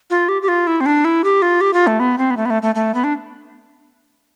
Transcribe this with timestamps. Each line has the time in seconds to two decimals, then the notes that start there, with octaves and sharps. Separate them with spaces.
0.10 F4
0.29 G4
0.42 G4
0.48 F4
0.67 E4
0.81 C4
0.86 D4
1.05 E4
1.24 G4
1.42 F4
1.61 G4
1.73 F4
1.87 A3
2.00 B3
2.18 C4
2.31 B3
2.37 A3
2.46 B3
2.50 A3
2.62 A3
2.75 A3
2.94 B3
3.04 D4